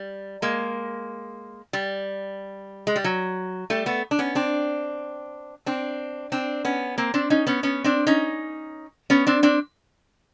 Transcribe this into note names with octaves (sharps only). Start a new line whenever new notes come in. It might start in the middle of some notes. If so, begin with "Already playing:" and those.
Already playing: G3
G#3 A#3
G3
G#3
G3
F#3
G3 A3
A3 B3
D4
B3 C#4
C4 D4
C4 D4
C4 D4
B3 C#4
A#3 C4
C4 D4
C#4 D#4
B3 C#4
B3 C#4
C4 D4
C#4 D#4
B3 C#4
C4 D4
C4 D4